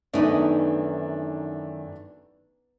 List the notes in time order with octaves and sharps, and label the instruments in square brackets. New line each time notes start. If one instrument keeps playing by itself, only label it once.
[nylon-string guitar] F#2 D#3 E3 [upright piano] A3 D4 [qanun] B3 D#4